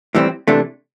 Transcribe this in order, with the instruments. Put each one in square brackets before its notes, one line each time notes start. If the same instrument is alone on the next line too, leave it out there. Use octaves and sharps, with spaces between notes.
[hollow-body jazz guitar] A2 E3 G3 C4
C3 E3 A3 D4